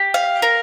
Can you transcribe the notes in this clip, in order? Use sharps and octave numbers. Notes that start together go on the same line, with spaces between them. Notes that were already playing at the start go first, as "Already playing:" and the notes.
Already playing: G4
F5
A#4